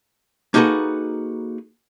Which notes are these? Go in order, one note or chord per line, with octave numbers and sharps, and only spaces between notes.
A#3 D#4 F#4 G#4 A4 B4